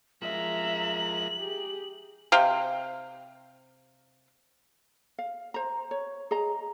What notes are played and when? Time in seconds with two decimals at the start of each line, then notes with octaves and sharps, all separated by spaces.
0.22 F3 G#3 A#4 E5 A#5 F#7
1.39 G4 G#4
2.32 C3 F5 G5
5.18 F5
5.54 C5 A#5
5.91 C#5
6.31 G#4 D#5 A#5